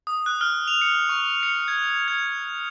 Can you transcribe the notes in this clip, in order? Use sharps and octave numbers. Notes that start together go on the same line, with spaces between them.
D#6
F#6
F6
F7
C#7
C#6
C#7
G#6
G#6